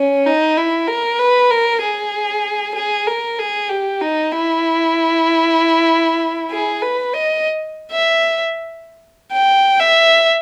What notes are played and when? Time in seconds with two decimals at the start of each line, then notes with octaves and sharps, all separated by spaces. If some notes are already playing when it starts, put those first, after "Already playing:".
Already playing: C#4
0.26 D#4
0.57 E4
0.87 A#4
1.19 B4
1.51 A#4
1.82 G#4
2.75 G#4
3.07 A#4
3.39 G#4
3.69 G4
4.01 D#4
4.32 E4
6.51 G#4
6.82 B4
7.13 D#5
7.92 E5
9.32 G5
9.80 E5